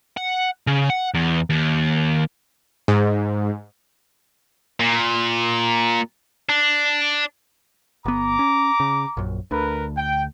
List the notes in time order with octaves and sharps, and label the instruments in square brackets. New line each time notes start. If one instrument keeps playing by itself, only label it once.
[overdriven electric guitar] F#5
C#3
F#5
E2
D#2
[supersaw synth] G#2
[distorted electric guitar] A#2
D4
[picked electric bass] G1 B3 [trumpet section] A#5 D6
[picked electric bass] C#4
C#3
A#1 F#2
[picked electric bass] D2 D3 [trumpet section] A#4 B4
[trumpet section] G5